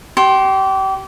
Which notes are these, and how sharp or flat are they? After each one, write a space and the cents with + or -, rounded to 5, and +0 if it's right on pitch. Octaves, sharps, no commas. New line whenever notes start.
G4 -30 C6 +20